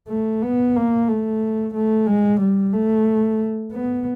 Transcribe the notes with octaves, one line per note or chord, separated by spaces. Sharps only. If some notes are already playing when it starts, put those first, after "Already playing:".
A3
B3
A#3
A3
A3
G#3
G3
A3
B3